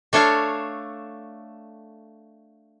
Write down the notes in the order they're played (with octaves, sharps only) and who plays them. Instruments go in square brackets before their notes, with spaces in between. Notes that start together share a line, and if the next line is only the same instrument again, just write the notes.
[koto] A3 D4 A4 C#5 F5